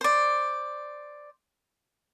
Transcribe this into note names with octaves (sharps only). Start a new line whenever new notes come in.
C5 D5